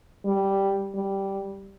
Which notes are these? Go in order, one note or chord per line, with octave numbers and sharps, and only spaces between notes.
G3
G3